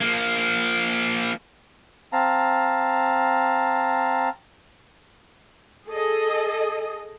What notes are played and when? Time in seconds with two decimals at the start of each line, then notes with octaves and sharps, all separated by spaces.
0.01 F3 A#3
2.13 C4 F5 A5 A#5
5.87 G#4 A4 D#5